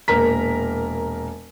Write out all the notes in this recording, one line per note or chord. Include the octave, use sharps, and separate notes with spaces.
E1 A#2 A#4 A#5 B6